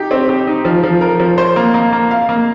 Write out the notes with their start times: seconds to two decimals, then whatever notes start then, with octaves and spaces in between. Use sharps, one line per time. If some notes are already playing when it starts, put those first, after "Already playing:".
Already playing: D#4 G4
0.11 C4
0.29 G4
0.47 D#4
0.65 F3
0.84 F3
1.01 A#4
1.20 F3
1.38 C5
1.56 A#3
1.74 A#3
1.93 A#3
2.11 F5
2.29 A#3